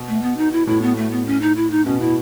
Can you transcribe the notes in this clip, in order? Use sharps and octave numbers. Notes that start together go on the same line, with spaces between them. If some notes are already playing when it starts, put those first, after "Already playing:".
Already playing: B2
A3
B3
D#4
E4
A2 E4
B3
A3
B3
C#4
D#4
E4
D#4
B2 C#4
B2 E4